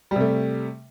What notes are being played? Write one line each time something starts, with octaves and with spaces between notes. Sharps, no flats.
C3 G3 A3